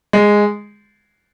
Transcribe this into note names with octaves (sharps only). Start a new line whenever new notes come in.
G#3